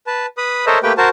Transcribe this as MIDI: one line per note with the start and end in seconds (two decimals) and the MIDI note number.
0.07 0.26 71
0.07 0.26 81
0.37 0.65 71
0.37 0.65 83
0.37 0.65 87
0.66 0.78 69
0.66 0.78 70
0.66 0.78 72
0.66 0.78 73
0.66 0.78 75
0.66 0.78 76
0.83 0.93 57
0.83 0.93 58
0.83 0.93 67
0.83 0.93 71
0.83 0.93 79
0.98 1.09 66
0.98 1.09 70
0.98 1.09 72
0.98 1.09 81